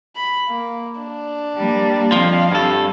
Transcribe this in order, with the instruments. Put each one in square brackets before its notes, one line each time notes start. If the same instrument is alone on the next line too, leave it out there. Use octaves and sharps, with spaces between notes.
[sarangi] B5
A#3
D4
[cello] G3 A#3
[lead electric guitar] F2 F3 [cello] C4 F5
[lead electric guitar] G2 A4